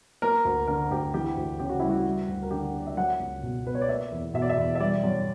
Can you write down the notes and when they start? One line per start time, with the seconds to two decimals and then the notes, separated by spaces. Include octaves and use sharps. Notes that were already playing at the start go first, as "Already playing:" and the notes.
0.22 A#3 A#4
0.45 D2
0.67 D3 A#4
0.91 D2 G4
1.14 E3 G4
1.37 D2
1.59 C#3 G4
1.69 F#4
1.80 G3 E4
1.89 F#4
2.05 G3
2.29 D2
2.42 A#4
2.51 D3 G4
2.74 A#3 D5
2.87 E5
2.97 F#3 F#5
3.20 C#2
3.43 B2
3.65 B3 B4
3.75 C#5
3.81 D5
3.89 A#3 E5
4.12 E2
4.34 B2 E5
4.42 D5
4.49 E5
4.58 E2
4.75 E5
4.80 G3 D5
5.04 F#2